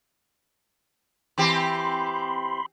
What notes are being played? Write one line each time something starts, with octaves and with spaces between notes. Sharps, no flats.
E3 C4 G4 B5 C6